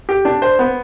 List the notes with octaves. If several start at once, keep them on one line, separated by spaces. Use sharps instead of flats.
G4
D4
C5
B3